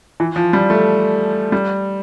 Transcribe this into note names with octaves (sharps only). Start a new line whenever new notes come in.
E3
F3
G3
A3
G3